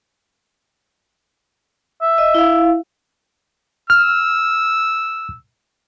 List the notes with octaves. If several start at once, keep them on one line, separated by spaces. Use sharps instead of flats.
E5
D#5
E4 F5
E6 F6